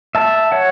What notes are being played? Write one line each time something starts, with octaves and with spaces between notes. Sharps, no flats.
E5 A5
C#5 F#5